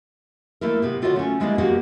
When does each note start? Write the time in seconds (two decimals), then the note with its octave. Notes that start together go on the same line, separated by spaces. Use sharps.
0.61 A3 A#3 E4 A#4
0.82 C3 B3 G4
1.02 D3 F4 F#4 C#5 D#5 F#5
1.16 A3 C#4
1.40 G3 G#3 A#3 B3 D4 E4
1.58 A#3 F#4 G4 A#4 B4 F#5